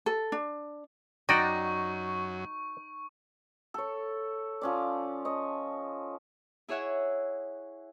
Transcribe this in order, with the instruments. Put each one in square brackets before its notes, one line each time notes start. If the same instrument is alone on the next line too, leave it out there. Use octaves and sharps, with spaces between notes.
[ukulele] A4
D4
[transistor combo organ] F#2 F#3 [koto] D#4 [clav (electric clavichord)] F#4 D5 G5 [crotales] C#6
[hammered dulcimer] A4 C#5
F3 C#4 D5
C#5 D#5
[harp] E4 G#4 C#5 E5 F#5